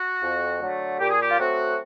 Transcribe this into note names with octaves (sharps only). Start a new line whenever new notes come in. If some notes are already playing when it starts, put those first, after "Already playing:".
Already playing: F#4
F2
D3 F#3 A3
A#2 G4
G#4
G4
F4
F#3 A3 C4 F#4